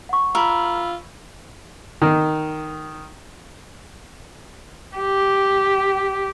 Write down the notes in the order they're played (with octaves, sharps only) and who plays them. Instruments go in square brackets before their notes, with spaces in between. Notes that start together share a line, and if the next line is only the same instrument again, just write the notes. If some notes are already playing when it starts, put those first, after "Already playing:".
[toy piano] F#5 C#6
[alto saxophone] F4 [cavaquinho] A#4 [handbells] B5 E6
[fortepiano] D#3
[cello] G4